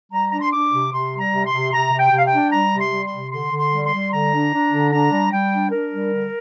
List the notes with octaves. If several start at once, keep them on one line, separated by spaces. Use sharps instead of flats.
G3 A#5
D4 A#5
C6
D4 D6
C3
C3 C6
G3
A#5
C3
C6
C3
C3 A#5
C3
G5
C3
F5
G5
D4
G3 A#5
C3
C6
G3
C6
C3
D3 C6
D3
C6
G3
C6
G3
D3 A#5
D4
D4
D3
D4 A#5
G3
G3 G5
D4
D4 A#4
G3
D3